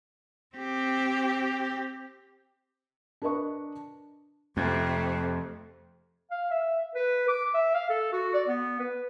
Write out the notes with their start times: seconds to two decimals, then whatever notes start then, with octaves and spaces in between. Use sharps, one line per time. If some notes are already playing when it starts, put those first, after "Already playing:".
0.56 C4 G4
3.22 D4 A#4 B4 D#5 C#6
4.57 F2 C3 A3
6.31 F5
6.51 E5
6.95 B4
7.28 D6
7.54 E5
7.75 F5
7.90 A4
8.12 F#4
8.34 D5
8.48 B3
8.80 B4